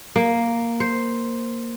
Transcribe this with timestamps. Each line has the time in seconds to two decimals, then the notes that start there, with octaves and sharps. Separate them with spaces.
0.16 A#3
0.80 C5